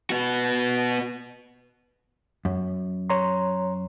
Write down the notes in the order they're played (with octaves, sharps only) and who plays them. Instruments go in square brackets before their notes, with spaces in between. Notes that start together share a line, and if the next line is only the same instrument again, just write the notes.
[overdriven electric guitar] B3 F#4
[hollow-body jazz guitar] F#2
[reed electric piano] C#5 A#5 C6